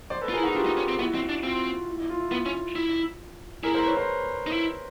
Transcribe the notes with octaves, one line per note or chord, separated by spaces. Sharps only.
C5 D5
A4 B4
F4
G#4 A#4
E4
D#4 F#4 G#4
D4 F4 G4
D#4
C#4
C4
B3 E4 F#4
C4
D4
C4 F4
E4
E4
F4
E4
B3
C#4
E4
E4 G#4 A#4
A#4 C5
B4 C#5
A#4 C5
D#4
E4